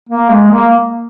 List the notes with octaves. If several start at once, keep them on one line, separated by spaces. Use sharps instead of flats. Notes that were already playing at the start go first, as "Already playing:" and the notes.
A#3
G#3
A#3